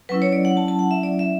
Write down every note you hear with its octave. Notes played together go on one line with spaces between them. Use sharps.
F#3 C#4 E4 B4
C#5
D5
F#5
A5
A5
F#5
E5
D5
E5